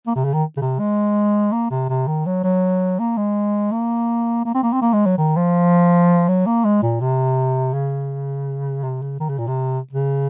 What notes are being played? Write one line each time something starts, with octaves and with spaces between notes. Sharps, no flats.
A#3
C3
C#3
D#3
C#3
C3
G#3
A#3
C3
C3
D#3
F#3
F#3
A#3
G#3
A#3
A#3
C4
A#3
C4
A#3
G#3
F#3
D#3
F3
F#3
A#3
G#3
A#2
C3
C#3
C3
C#3
D#3
C#3
A#2
C3
C#3